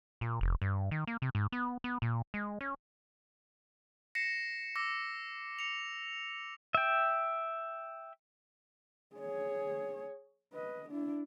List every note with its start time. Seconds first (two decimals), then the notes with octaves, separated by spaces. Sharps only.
0.21 A#2
0.41 F1
0.62 G2
0.91 D#3
1.07 A#3
1.22 C3
1.35 G#2
1.52 B3
1.84 B3
2.02 A#2
2.34 G#3
2.61 C#4
4.15 A#6 C7 C#7 E7
4.76 D6 E6 A#6
5.59 C#7 F7
6.75 E5 G5
9.16 G#4 C#5
10.53 B4 D#5
10.90 D4 E4